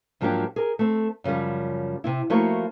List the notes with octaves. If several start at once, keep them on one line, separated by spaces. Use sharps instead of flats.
G#2 F3 F#3 A#3 D4 G4
G#4 A#4
A3 C4
F#2 C#3 E3 F3 G3
C3 C4 E4
F3 A3 A#3 E4 F#4 C#5